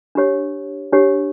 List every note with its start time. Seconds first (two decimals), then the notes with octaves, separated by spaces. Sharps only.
0.15 D4 G4 C#5
0.93 D4 G4 C#5